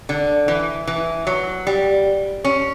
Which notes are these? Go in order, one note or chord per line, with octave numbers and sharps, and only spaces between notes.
D3
E3
E3
F#3
G3
C#4